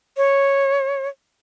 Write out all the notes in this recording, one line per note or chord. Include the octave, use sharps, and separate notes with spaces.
C#5